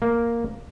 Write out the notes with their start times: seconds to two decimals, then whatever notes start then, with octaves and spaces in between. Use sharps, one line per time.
0.02 A#3